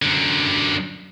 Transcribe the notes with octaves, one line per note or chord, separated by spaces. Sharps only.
F#2 D3